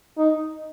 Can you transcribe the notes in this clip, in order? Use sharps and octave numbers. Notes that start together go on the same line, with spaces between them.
D#4